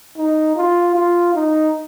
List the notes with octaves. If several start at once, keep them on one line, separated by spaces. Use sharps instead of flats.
D#4
F4
F4
D#4